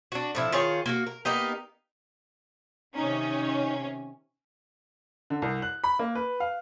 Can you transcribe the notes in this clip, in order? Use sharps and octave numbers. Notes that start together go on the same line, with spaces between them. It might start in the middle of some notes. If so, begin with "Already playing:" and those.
D4 F#4
A2 F3 E4
D#3 F4 G#4 C#5
A#3 F4 F#4
A#4
A#3 B3 D#4 G4
C3 D#3 C#4 D#4
D3
C2
F#6
B5
A#3
B4
F5